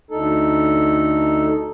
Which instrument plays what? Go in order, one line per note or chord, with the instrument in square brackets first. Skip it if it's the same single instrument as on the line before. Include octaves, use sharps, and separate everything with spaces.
[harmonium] D2 D#4 A4